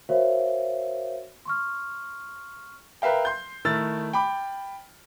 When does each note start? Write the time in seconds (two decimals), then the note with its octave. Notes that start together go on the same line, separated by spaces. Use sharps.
0.09 F#4 A#4 C5 C#5 E5 F5
1.45 C6 C#6 F6
3.02 A#4 B4 E5 F5 G5
3.25 C6 G6
3.65 D#3 A3 E4 E6 F6 A6
4.13 G5 B5 D6